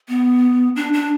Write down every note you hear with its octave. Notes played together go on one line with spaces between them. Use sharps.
B3
D4
D4